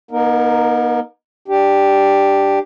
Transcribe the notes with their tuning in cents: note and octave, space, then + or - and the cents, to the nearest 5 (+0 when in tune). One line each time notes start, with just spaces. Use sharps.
B3 -45 D#4 +0 A#4 +0
D4 +5 G4 +0